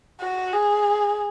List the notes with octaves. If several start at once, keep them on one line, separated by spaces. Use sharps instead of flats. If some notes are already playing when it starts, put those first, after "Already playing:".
F#4
G#4